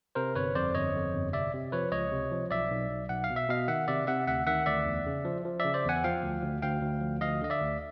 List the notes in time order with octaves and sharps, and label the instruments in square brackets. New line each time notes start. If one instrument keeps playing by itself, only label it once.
[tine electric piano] C3 A#4 C5
G1 B4 C#5
F2 C5 D5
G1 C#5 D#5
F2
G1
C3 D5 E5
C3
F3 B4 C#5
C#2 C#5 D#5
C3
F3
B1 D5 E5
B1
B1
B1 F#5
F5
B2
E5
B2 D#5 F5
D#3 E5 F#5
C3 D5 E5
C3 E5 F#5
D2 E5 F#5
D#3 E5 F#5
D2 D5 E5
E2
C#3
F3
F3
D5 E5
C#3
C5 D5
E2 F#5 G#5
F3 F5 G5
D2
D2
D2 F5 G5
D2
F3
D2 D#5 F5
D3 D#5
D5 E5
D2